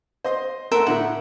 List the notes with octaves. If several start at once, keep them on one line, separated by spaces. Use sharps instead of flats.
C5 D#5 C6
A3 A4 A#4 E5 F#5 C6
A2 D3 A3 F#5